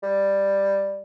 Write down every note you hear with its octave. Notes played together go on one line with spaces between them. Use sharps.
G3